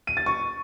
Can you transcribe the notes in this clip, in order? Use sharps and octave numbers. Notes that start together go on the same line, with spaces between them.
D#7
A6
C#6